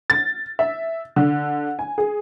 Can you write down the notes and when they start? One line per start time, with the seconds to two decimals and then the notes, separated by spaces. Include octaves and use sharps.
0.10 A6
0.59 E5
1.16 D3
1.79 G#5
1.98 G#4